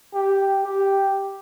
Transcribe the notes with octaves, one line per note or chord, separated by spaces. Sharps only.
G4
G4